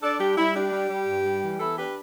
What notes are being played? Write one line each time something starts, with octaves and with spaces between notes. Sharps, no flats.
D4 A4 D5
G3 G4
G3 E4
D4 G4
G3
G3
G2
G3
E3
B3 E4 A4
D4 G4 B4